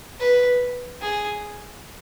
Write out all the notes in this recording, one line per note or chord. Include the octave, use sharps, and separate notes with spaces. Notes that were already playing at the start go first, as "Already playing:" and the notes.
B4
G#4